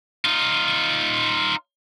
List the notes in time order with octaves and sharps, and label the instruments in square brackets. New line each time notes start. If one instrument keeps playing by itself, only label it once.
[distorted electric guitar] D#4 F4